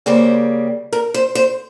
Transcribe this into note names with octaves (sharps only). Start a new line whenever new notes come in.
C#3 G3 A#3 C5
A#4
C5
C5